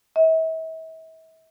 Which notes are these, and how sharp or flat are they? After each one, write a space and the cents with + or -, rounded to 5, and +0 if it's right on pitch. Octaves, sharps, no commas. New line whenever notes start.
E5 -40